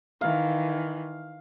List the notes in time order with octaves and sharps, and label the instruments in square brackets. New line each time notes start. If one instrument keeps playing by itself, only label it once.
[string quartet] D#3 E3 [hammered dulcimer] F5